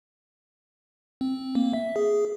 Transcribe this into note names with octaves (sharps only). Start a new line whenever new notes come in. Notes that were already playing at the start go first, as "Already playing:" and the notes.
C4
A#3
E5
G#4